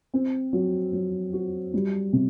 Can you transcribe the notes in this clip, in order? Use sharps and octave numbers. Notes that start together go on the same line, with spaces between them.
C4
F#3
F#3
F#4
G3
C3